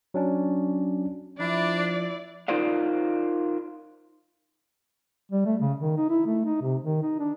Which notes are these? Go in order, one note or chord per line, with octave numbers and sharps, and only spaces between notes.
F#3 C#4 D4
F3 D4 E4 D5
D#4 F4 A#4 C5 D5 F5
G3
A3
C#3
D#3
D#4
E4
A3
D#4
C3
D#3
D#4
D4